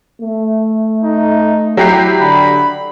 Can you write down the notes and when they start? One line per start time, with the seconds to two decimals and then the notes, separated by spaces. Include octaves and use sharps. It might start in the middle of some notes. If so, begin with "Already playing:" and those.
0.22 A3
1.03 D#4
1.77 F#3 E4 G4 C7
2.21 D3 B5